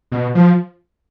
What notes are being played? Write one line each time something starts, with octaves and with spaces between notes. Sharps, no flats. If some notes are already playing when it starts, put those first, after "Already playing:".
B2
F3